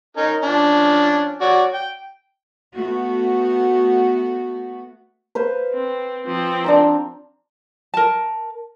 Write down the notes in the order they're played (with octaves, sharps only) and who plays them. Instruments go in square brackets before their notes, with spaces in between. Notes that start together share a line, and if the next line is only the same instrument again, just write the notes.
[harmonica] C#4 D#4 A#4
F3 C#4 D4
F#4 C#5 D5
G5
[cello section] A3 B3 F#4
[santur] B4 C5 F5
[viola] C4
F3 C4
[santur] D4 F5 A#5
[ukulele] A#4 A5